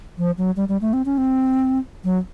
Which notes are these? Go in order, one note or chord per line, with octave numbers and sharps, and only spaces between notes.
F3
F#3
G3
G3
A3
C4
C#4
C4
F#3